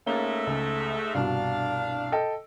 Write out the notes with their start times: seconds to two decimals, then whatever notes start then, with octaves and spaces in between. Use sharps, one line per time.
0.06 G#2 A3 A#3 C#4 G7
0.47 C#2
1.14 C2 G2 B2 D4 F5
2.12 A4 D#5 G5